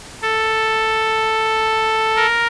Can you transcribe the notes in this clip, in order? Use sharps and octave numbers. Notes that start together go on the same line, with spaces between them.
A4
A#4